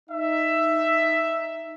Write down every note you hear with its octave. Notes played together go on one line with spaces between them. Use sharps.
D#4 E5